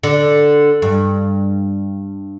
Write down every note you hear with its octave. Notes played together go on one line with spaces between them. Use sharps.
D3
G2